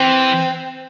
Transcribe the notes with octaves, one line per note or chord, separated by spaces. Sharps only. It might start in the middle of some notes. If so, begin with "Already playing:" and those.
Already playing: E3 C4